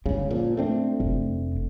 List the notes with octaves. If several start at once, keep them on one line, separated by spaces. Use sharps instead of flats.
G1 C#3 G#3
A#2 F3
A3 C4 D4
F1